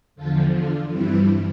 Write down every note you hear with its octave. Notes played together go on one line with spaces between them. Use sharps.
E2 D3 F3 F4 A4
D4 F4
G2 E3 G3 C4 E4